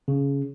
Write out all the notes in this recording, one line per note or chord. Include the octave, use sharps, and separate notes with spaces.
C#3